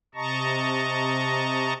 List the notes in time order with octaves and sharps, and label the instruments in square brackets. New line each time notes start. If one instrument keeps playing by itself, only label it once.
[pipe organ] C3 D#5 A5 A#5 C#6